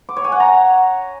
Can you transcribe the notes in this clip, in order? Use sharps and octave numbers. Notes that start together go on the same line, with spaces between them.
D6
C#5
G#5
F#5
A#5